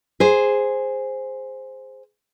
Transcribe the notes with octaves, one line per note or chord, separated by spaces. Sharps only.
G#4 C5